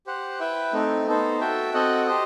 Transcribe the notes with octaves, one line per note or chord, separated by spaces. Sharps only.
G4 C5 F#5
E4 B4 E5 G5
A3 C4 D#4
B3 D#4 A4 C5
F#4 A4 E5 G5
C4 F#4 A4 D#5 F#5
G4 C5 D#5